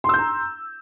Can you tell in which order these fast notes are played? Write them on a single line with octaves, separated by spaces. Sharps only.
C6 E6 G6 A#5